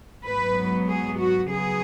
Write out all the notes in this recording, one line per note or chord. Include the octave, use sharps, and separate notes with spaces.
G#2 F#3 B3 B4
G#4
F#4
C#3 F#3 B3 G#4